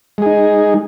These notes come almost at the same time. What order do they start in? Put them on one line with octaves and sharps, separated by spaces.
G#3 G#4 D#4